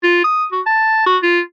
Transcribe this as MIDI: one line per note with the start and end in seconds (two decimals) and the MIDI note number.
0.03 0.20 65
0.24 0.46 87
0.52 0.61 66
0.66 1.03 81
1.06 1.17 66
1.22 1.40 65